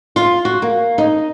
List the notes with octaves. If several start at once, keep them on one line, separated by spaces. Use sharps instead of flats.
F4
F#4
A#3
D#4